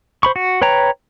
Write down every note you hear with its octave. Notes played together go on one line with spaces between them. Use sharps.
C5 B5 C#6
F#4
B4 C#5 G5 A#5